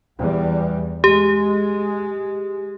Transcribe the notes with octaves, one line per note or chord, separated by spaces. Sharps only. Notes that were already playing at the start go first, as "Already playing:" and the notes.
E2 G3
G#3 G4